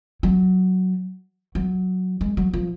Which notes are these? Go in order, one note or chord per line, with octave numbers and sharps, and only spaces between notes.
F#3
F#3
G#3
F#3
F3